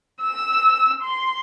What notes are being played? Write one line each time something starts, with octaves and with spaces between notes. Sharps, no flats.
E6
C6